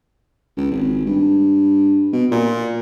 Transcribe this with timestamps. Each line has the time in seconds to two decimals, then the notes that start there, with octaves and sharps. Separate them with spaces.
0.57 C#2
0.71 G#1
1.06 G2
2.13 B2
2.31 A#2